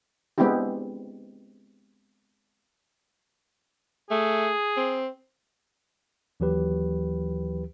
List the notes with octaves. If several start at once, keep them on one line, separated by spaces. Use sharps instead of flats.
G#3 B3 C4 D4 E4 G4
A3 G#4
C4
D#2 E3 F#3 G4 B4